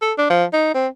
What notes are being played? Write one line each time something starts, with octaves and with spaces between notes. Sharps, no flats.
A4
D4
F3
D#4
C4